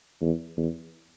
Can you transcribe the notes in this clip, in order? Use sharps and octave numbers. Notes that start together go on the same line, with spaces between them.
E2
E2